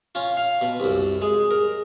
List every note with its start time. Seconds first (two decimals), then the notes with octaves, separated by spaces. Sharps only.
0.15 C#4 F4
0.37 F5
0.61 B2
0.80 C2 F#2
1.22 G#3 G#4
1.51 A#4